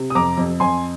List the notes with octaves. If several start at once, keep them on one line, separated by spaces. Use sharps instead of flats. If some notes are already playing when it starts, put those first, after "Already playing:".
Already playing: C3
D#6
F2 A#5 D6
F2
F2 G#5 C6